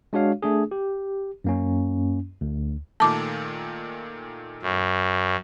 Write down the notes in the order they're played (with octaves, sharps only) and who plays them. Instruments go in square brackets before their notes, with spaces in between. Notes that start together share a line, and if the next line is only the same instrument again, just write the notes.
[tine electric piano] G#3 D4 F#4 C#5 F5
A3 D4 G#4
G4
F#2 A#3 C#4
D2
[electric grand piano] A#2 D#3 A3 [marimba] A5 D6
[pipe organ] F#2